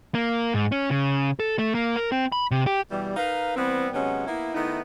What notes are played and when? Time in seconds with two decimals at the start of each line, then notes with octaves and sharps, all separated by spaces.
0.15 A#3
0.54 G#2
0.72 C#4
0.91 C#3
1.40 A4
1.59 A3
1.75 A#3
1.96 A#4
2.12 C4
2.32 B5
2.51 C3
2.67 G4
2.91 B2 E3 G3
3.16 D#4 A#4 B4 F5
3.56 E3 G3 B3 C4
3.93 C3 F#3 G#3 B3 C#4
4.27 A#3 B3 E4
4.55 D#3 A3 B3 D#4 E4